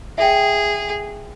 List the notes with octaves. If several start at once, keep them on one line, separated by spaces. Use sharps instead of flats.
G#4 E5 G5